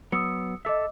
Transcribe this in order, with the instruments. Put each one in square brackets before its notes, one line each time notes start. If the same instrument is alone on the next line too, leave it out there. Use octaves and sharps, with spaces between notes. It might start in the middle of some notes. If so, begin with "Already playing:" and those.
[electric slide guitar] F#3 B3 [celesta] D#6 E6 C#7
[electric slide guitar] A4 E5 [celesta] D#5 D6 E6